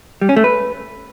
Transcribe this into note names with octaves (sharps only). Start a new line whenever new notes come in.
G3
C#4
A3
B4